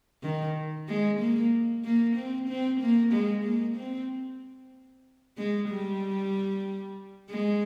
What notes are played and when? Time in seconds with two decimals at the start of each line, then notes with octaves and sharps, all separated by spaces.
0.23 D#3
0.88 G#3
1.19 A#3
1.84 A#3
2.16 C4
2.48 C4
2.81 A#3
3.13 G#3
3.44 A#3
3.76 C4
5.37 G#3
5.69 G3
7.30 G#3